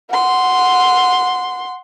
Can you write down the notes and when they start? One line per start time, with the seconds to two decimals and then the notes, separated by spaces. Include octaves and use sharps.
0.11 F#5 C6